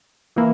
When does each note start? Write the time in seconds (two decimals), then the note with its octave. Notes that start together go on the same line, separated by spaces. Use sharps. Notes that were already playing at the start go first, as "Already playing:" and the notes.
0.36 E3 A#3 E4